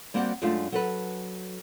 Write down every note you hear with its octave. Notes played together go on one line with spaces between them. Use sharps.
G3 A#3 C4 F#4 D5 F#5
F#2 G#3 A3 C#4 D4 F4
F#3 A4 B4